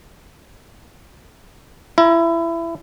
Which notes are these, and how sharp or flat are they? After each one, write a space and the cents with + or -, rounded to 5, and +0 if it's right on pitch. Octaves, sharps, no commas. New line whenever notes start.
E4 +25 A#5 +45